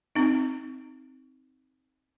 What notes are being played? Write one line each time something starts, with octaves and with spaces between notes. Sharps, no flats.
C4 D#4